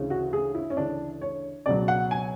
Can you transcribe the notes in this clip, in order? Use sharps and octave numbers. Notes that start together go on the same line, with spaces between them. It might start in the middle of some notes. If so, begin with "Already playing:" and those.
Already playing: D2 C#3 E3
F#4
G#4
E4
C#4
D2 C#3 E3 D4
C#5
C#2 B2 F#3 D5
F#5
G#5